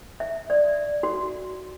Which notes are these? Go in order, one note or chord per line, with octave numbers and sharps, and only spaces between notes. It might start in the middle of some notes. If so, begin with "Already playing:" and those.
E5
D5
F#4